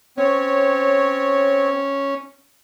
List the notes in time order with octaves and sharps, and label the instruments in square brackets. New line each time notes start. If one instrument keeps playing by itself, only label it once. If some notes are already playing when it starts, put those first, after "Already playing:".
[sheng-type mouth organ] C4 C#5 [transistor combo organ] C#4